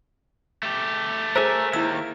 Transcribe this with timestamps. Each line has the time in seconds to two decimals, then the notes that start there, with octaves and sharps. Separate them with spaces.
0.63 A3 G4
1.36 G#4 A#4 C5 E5 G#5
1.73 D#2 E4 E6